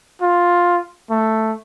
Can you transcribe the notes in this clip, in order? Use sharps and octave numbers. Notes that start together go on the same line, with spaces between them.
F4
A3